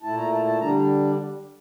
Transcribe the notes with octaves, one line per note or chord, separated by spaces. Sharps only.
A#2 A3 E4 A5
A#5
A5
A5
D3 G3 D4 A#5